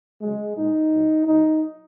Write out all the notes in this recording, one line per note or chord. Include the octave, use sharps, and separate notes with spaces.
C#3 F#3 G#3
A#2 G#3 D#4
A#2 F#3
A#2 F#3 D#4